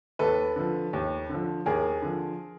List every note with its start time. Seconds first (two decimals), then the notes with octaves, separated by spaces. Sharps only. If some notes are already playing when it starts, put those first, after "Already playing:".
0.19 D#2 A4 B4
0.56 D3 F3
0.93 D#2
1.29 D3 F3
1.66 D#2 G#4 A#4
2.02 D3 F3